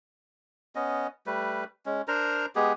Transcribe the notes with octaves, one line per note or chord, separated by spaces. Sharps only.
B3 C#4 D#5
G3 A3 B4
G#3 C#4
D4 A#4 C5 A#5
G#3 B3 G4 G#4